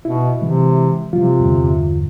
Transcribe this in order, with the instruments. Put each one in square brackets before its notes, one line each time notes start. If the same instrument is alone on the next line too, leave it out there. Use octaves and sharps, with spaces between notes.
[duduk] B2 [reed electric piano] E4
[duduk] C3 [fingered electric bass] E3 G#3
[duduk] C3 [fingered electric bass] F3 G3 [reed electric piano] F4
[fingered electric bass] E2 G2 D3